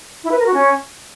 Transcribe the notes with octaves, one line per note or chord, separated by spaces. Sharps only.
E4
B4
A#4
F#4
C#4